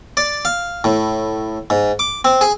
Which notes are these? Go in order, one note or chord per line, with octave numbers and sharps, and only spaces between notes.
D5
F5
A2
G#2
D6
C4
G#4